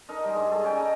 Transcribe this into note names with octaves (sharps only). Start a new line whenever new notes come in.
D#4 A4 A#4 D#5
G3 G#3
G2
G#4 A4
C#4 D5 G5
A4 D#5 A#5